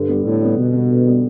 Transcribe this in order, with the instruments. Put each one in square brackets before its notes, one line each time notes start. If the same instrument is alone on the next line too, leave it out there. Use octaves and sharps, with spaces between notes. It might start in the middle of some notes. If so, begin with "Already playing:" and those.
Already playing: [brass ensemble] G2 [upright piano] D3
[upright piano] G3 B3
[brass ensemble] A2 [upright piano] D3
[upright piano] G3 B3
[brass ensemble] B2 [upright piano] D3
[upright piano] G3 B3
D3
G3 B3